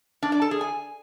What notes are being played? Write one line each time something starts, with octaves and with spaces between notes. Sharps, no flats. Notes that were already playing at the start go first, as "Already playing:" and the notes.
D4
D5
A4
G#4
G#5